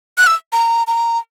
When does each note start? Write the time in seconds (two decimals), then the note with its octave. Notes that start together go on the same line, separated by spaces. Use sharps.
0.18 F#6
0.27 E6
0.53 A#5
0.87 A#5